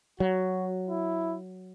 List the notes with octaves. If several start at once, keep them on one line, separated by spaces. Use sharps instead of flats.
F#3 F#4
E4